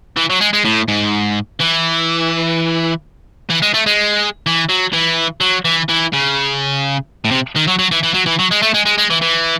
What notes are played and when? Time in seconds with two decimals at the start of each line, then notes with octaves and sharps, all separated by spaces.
0.17 E3
0.30 F#3
0.41 G#3
0.53 G#3
0.65 A2
0.88 G#2
1.60 E3
3.50 E3
3.62 G#3
3.74 A3
3.86 G#3
4.46 E3
4.69 F#3
4.93 E3
5.41 F#3
5.65 E3
5.89 E3
6.13 C#3
7.25 A2
7.31 C3
7.56 D#3
7.67 F#3
7.79 F#3
7.91 E3
8.03 E3
8.14 F#3
8.26 E3
8.39 F#3
8.51 G#3
8.62 A3
8.74 G#3
8.86 G#3
8.98 G#3
9.10 E3
9.22 E3